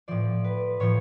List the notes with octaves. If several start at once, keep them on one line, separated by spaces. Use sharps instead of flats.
A2 F3 D5
B4
A2 F3 C#5